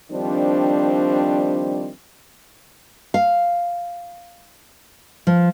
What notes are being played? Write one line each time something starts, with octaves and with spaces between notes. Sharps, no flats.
D#3 F3 G3 C4 D4
F5
F3